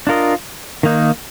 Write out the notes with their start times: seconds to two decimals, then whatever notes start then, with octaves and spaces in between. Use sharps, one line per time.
0.07 D4 F4 A#4 D#5
0.83 D#3 A#3 D#4